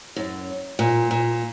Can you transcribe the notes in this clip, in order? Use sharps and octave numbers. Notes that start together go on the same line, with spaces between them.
F#2
A#2
A#2